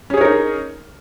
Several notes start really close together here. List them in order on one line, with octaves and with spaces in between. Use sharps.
C#4 G#4 C#5 A#4 D#4